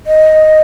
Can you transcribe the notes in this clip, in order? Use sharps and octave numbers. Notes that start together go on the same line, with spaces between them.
D#5